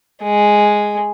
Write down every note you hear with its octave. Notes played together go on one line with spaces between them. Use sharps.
G#3